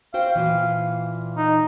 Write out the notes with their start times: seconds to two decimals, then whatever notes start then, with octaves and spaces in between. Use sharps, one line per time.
0.14 F#4 C5 F5 G5
0.36 A#2 E3
1.37 D#4